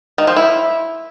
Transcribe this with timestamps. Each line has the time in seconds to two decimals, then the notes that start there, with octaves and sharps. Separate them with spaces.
0.18 D#3
0.27 F3
0.36 E4